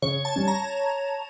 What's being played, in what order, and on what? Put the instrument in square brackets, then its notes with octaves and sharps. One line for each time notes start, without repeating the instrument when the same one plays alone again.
[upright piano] C#3 [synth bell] C#5
[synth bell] A5
[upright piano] G3 C#4
[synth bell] A#5